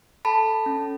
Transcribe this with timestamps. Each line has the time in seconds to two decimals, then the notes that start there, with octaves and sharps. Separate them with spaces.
0.25 A4 A5 B5
0.66 C#4